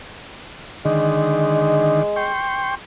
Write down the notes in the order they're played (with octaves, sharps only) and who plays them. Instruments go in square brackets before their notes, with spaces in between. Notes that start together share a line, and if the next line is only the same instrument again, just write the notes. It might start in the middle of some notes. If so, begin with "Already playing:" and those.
[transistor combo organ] D3 D#3 [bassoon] G#3
[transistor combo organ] G5 C6 C#6